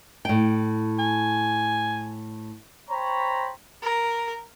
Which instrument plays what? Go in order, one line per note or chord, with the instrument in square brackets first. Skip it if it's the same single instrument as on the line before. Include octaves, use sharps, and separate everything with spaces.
[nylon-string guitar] A2 G5
[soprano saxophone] G#5
[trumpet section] C5 C#5 G5 A#5 B5 C#6
[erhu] A#4